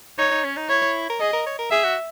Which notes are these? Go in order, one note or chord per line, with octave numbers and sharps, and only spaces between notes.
D#4 C#5
D#4
C#4
D#4
E4 C#5
A#4
G#4 D#5
A#4
C#5
A#4
G#4 E5
F#4